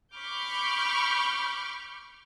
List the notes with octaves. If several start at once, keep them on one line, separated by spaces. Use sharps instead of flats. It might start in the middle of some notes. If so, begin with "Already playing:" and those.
B5 C#6 D6 F6 G6